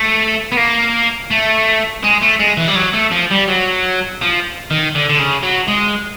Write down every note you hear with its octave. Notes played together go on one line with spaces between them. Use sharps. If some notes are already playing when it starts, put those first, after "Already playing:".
Already playing: A3
B3
A#3
A3
G#3
A3
G#3
E3
G3
F#3
A3
F3
G3
F#3
F3
D#3
D3
D3
C#3
F#3
G#3